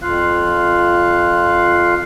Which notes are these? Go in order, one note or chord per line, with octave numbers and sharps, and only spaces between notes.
F2 F4 F5 F#6